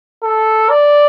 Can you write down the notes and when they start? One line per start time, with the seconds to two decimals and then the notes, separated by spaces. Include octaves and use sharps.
0.23 A4
0.70 D5